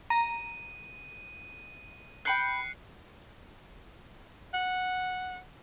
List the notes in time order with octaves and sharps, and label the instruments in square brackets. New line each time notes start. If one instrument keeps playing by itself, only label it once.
[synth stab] A#5 [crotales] D#7
[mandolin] G5 B5 G6 [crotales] F#6 C7 C#7
[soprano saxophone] F#5